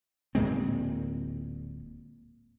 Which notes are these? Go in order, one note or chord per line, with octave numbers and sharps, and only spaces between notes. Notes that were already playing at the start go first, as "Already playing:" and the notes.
D1 A#2 G#3 C4